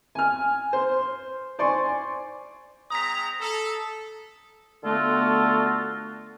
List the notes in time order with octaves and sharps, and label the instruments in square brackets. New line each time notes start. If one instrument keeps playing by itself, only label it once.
[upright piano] G#5 F6
C5
C5 D5 G#5 C6 C#6
[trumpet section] G#3 C4 A#5 [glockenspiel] D#6 B6
[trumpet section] A4
[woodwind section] D3 A3 B3 F4 F#4 A4